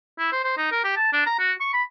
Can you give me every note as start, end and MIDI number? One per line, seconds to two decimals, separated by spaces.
0.18 0.28 64
0.32 0.42 72
0.44 0.57 72
0.57 0.70 63
0.72 0.81 70
0.84 0.94 67
0.96 1.12 81
1.13 1.23 62
1.26 1.39 82
1.39 1.53 66
1.60 1.71 85
1.73 1.82 83